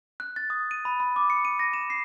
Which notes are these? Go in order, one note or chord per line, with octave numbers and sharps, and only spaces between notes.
F#6
A6
D#6
D#7
B5
B5
D6
C#7
D#7
A#6
E7
C7